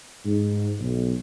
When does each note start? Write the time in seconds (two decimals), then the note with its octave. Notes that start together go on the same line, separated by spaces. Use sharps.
0.24 G#2
0.80 B1